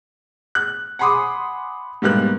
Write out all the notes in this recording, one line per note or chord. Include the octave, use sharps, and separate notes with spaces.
F#6
F#5 G#5 B5 C6 D6 D#6
G#2 G3 A#3 B3 F#6